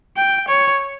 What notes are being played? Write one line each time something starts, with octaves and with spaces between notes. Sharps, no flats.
G5
C#5